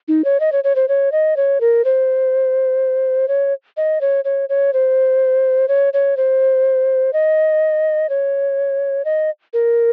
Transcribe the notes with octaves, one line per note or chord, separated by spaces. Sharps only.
D#4
C#5
D#5
C#5
C#5
C5
C#5
D#5
C#5
A#4
C5
C#5
D#5
C#5
C#5
C#5
C5
C#5
C#5
C5
D#5
C#5
D#5
A#4